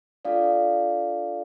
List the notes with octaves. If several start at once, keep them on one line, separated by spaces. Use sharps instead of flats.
D4 F4 A4 D5 F5